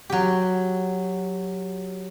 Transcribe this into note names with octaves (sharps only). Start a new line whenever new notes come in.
F#3 G4